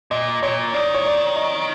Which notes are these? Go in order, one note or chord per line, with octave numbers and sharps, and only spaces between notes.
A#2 D#5
A#2 C#5
D#3 D5
C#5
D5
D#5